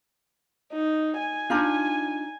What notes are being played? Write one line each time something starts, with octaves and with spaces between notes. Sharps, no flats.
D#4
G#5
D4 D#4 F4